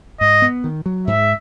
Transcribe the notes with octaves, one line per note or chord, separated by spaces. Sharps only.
G#2 D#5
B3
D#3
F#3
G#2 E5